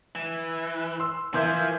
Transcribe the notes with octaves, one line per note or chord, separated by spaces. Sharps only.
E3
C6 E6
E3 F3 A#4 E5 C6 G6 G#6